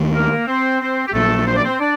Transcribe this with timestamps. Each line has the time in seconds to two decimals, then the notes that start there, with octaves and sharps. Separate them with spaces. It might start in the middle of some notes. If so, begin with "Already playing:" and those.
Already playing: D#2 D#3 A3
0.13 A#3 A#4
0.47 C4 C5
0.80 C4 C5
1.07 G4
1.13 A#1 A#2 F#3 A3 A4
1.46 C5
1.56 D5
1.64 C4 C5
1.79 D4 D5